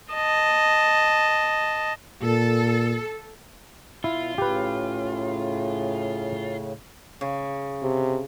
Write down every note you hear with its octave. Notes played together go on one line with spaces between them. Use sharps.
D#5 A5
A#2 A4
B2 E4 F4
A2 C#3 G4 B4
C#3
C3